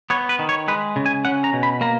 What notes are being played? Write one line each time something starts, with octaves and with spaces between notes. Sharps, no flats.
B3 C#5
B4
D#3
C#5
G#3 B4
C#3
G#5
C#4 F#5
A#5
B2
B5
A#3 A#5